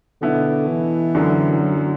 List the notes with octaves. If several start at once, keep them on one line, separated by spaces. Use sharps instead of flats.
B2 D3 B3 E4
E3
F#2 D3 F#3
E3
F#3
F#3